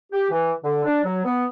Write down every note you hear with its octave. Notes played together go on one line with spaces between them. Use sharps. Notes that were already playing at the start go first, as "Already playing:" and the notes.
G4
E3
D3
D4
F#3
B3